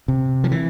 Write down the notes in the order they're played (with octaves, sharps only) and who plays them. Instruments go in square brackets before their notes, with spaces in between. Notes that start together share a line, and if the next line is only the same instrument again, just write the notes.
[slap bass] C3
F3
E3